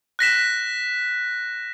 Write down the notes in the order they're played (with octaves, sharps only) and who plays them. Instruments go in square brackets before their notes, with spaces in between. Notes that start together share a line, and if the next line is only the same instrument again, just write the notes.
[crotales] F#6 A#6 B6 E7